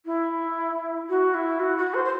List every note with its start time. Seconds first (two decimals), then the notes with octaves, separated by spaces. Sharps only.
0.06 E4
1.09 F#4
1.34 E4
1.60 F#4
1.78 F#4
1.94 C5
2.05 C5